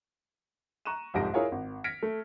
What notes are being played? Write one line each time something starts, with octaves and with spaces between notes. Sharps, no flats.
A#5 C#6 F#6 D#7 E7
C2 F2 G#2 G4 A#6 D7
E4 F4 G#4 A#4 C#5 F5
G#1
F6 G#6 A#6 B6 C#7 D7
A3